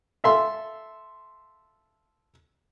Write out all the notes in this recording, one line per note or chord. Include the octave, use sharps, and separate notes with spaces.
A4 E5 F5 C6